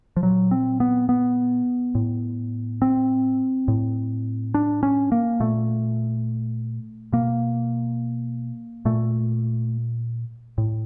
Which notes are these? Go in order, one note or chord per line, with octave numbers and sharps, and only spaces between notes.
F3
A#2 F#3
C4
B3
B3
A2
C4
A2
D4
C#4
A#3
A#2 A3
B2 A#3
A#2 A3
A2